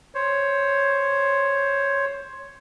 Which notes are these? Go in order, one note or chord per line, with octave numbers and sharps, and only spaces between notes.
C5 C#5